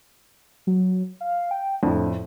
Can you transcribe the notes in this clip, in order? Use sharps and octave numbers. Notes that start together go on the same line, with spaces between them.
F#3
F5
G5
F2 A2 D4